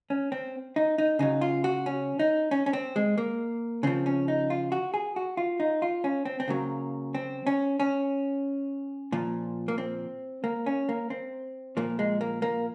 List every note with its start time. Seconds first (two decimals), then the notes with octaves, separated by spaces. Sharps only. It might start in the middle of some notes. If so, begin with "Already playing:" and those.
0.10 C#4
0.32 C4
0.76 D#4
0.98 D#4
1.19 C#3 F#3 D#4
1.41 F4
1.64 F#4
1.86 C#4
2.19 D#4
2.51 C#4
2.66 C#4
2.73 C4
2.96 G#3
3.18 A#3
3.83 C#3 F3 C4
4.06 C#4
4.28 D#4
4.50 F4
4.72 F#4
4.94 G#4
5.16 F#4
5.37 F4
5.60 D#4
5.82 F4
6.04 C#4
6.25 C4
6.40 C4
6.48 C#3 F#3 A#3
7.14 C4
7.47 C#4
7.80 C#4
9.12 A#2 F3
9.68 A#3
9.78 C4
10.44 A#3
10.66 C#4
10.89 A#3
11.10 C4
11.77 A#2 F3 A#3
11.99 G#3
12.21 A#3
12.42 A#3